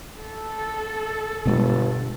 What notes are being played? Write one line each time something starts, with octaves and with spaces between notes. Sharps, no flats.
A4
G1 B2 G#3